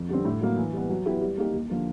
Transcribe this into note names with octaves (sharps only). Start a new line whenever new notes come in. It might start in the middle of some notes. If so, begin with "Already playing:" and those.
Already playing: F2
D3 G3 C4
A2
F#3 A#3
E3
G3 B3
F#3
B3 E4 G4
G3
A#3 D#4 G4
D#2
D3 F3 A#3